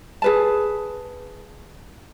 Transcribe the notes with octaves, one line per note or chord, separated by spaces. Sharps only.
G#4 B4 A5